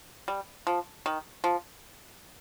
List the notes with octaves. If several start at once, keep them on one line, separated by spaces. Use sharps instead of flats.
G3
F3
D#3
F3